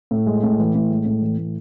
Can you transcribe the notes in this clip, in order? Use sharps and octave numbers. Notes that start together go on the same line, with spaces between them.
A2
G#3
A2
E3
A2
G#3
A2
E3
A2